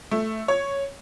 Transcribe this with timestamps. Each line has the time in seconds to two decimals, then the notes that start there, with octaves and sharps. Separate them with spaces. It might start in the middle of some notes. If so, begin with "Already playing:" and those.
0.11 A3
0.48 C#5